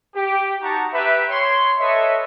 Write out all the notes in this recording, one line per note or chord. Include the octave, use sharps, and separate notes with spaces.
G4
D#4 F#4 F#5 A5 A#5 C#6
G4 B4 E5
C#5 C6
A4 B4 C#5 D#5 E5